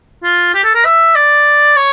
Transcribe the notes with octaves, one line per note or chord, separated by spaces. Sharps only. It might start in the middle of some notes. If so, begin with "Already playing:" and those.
F4
G4
A4
A#4
E5
D5
C#5